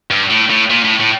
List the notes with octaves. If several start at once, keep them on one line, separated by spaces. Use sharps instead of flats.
G2
A2
A2
A#2
A2
A2